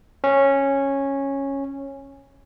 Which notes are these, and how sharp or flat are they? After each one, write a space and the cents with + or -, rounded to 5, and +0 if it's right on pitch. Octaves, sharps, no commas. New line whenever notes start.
C#4 -10